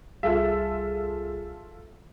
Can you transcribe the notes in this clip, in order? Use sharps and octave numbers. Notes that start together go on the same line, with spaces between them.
C2 G3 F4 G#4 A4 E5